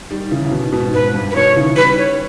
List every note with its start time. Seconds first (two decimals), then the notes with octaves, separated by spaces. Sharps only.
0.11 D#3 G3
0.31 C#3 E3
0.45 C#3
0.51 B2 D#3
0.72 G#2 B2
0.94 G#2 B4
1.14 G2
1.31 B4
1.36 B2 D#3 C#5
1.49 D#3
1.56 C#3 E3
1.76 D#3 G3 B4
1.98 C#5